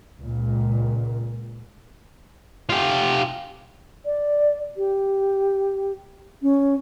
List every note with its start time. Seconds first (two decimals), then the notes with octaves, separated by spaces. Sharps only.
0.20 C#2 A#2
2.69 F4 G4
4.06 D5
4.77 G4
6.42 C#4